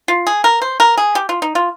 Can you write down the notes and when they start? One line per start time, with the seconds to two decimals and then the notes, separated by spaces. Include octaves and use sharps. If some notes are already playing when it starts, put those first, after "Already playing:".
0.08 F4
0.27 G#4
0.44 A#4
0.62 C5
0.80 A#4
0.98 G#4
1.15 G4
1.29 F4
1.42 D#4
1.55 F4